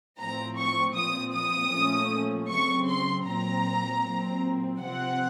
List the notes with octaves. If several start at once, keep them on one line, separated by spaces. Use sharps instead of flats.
A2 F3 C4 A#5
C#6
A#2 F3 C4 D#6
D#6
A#2 F3 A3 C#4
C#3 F#3 C4 C#6
C6
A#2 F#3 C4 A#5
A#2 F#3 C4
C3 F3 C4 F#5